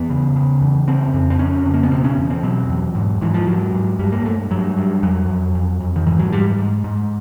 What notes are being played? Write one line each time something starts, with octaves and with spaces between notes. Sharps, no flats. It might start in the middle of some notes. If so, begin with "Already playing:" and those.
Already playing: E2 B3
C#3
C#3
E2
C#3 C4
F2
C4
F2 C#4
C#3
A#3
B3
B2 C4
C#4
E2
C4
B2 F#3
E2
G#2
G#2 E3
F3
G#2 F#3
G#2
G2 G3
A#3
G2 A3
G2 F#3
G2
F2 F#3
F2
F2
F2
D#3
G#2 E3
F#3
G#2 G3
G#2
G#2